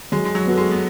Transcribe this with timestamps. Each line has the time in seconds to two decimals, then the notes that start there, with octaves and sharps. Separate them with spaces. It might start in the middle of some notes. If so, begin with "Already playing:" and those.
0.12 F#3 G#3
0.25 G#3
0.35 F#3
0.46 B3 F#4 A4
0.58 G#3
0.71 B3